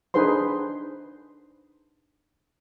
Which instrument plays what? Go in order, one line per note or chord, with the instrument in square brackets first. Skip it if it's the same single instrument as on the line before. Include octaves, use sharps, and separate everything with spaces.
[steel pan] D4 D#4 G#4 B4 C5 C6